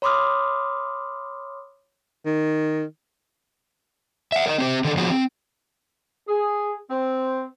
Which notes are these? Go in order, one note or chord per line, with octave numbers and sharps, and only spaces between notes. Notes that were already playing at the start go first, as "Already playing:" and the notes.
C#5 B5 C6 D6 D#6 F6
D#3
E5 F#5
A#4 C#5 D#5
C4 G4 C5
D3 D#3 A4
F3 B3 F4 F#4 G#4 C5
C4
G#4
C4